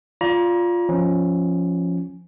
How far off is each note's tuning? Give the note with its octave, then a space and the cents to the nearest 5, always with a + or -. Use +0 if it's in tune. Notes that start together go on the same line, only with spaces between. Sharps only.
F4 +0 D5 -20 A#5 +35
F3 +0 C#4 +0